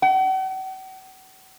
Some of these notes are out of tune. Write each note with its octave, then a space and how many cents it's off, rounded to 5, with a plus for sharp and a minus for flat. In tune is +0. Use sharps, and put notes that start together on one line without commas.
F#5 +45